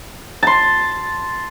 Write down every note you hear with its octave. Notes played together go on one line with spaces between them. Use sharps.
A5 C6